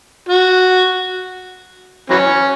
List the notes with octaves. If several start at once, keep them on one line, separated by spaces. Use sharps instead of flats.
F#4
E3 F#3 C#4